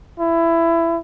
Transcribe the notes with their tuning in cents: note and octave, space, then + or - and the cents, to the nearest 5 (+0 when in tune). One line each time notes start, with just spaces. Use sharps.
E4 +20